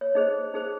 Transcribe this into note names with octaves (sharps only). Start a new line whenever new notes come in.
C#5
D#4 G#4 C5 D#5
D#4 G#4 C5